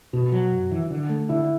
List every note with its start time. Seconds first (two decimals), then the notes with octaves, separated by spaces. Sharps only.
0.13 B2 F#4
0.32 F#3
0.52 F#2
0.71 E3
0.90 D3
1.09 A3
1.29 D3 E4